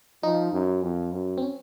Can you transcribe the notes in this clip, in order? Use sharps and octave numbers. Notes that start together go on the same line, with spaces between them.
F3 D#4
F#2
F2
F#2
C4
C#4